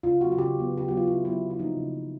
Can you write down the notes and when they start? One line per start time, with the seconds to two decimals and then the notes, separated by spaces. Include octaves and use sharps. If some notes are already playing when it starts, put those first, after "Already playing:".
0.03 C#3 F4
0.21 F#3 B3 F#4
0.32 F#4
0.38 C#3 G4
0.55 F#3 B3
0.72 C#3
0.77 G4
0.88 F#3 B3 F#4
0.97 F4
1.07 C#3 E4
1.24 F#3 B3 E4
1.41 C#3
1.50 E4
1.59 F3 A#3 D#4
1.77 C#3
1.94 F3 A#3